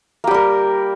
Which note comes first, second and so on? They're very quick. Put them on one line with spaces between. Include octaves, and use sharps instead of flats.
A#3 G4 G3 A#4